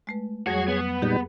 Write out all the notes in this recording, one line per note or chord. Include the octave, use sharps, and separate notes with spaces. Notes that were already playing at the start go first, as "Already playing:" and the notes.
G#3 A3 B4
F2 F#3 G3 F#4 G#4 C#5 G#6
B3
A#2 G3 D#4 G4 G#4